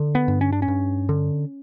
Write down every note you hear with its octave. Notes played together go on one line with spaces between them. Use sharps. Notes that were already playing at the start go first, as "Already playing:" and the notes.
Already playing: D3
B3
G2
C#4
D4
C#4
G2
D3